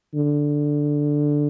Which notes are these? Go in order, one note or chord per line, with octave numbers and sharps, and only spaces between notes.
D3